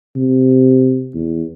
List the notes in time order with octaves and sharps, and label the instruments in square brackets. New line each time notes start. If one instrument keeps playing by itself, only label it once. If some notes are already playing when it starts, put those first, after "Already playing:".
[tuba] C3
E2